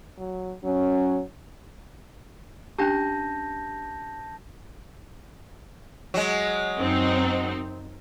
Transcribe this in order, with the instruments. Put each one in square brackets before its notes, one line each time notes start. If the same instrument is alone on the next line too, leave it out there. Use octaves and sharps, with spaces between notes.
[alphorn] F#3
[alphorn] F#3 [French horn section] C#4
[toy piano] C#4 D4 G4 [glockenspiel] A5 G6 A#6
[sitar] F#3 G#3
[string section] F#2 C4 D#4